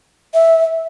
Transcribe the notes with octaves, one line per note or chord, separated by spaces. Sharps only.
E5